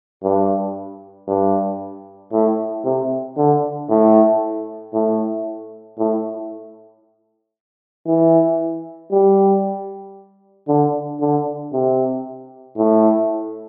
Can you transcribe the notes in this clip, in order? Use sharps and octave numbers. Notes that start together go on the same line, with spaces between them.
G2
G2
A2
C3
D3
A2
A2
A2
E3
G3
D3
D3
C3
A2